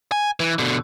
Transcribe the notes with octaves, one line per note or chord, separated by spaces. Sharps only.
G#5
E3
B2 D3